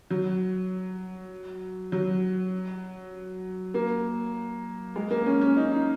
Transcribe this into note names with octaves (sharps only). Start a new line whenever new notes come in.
F#3
F#3
A#3
G#3
A#3
C#4
C#4
D#4
D#4